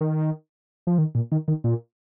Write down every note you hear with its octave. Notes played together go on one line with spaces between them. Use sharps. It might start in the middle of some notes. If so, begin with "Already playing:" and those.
D#3
F3
D#3
A#2
D#3
D#3
A#2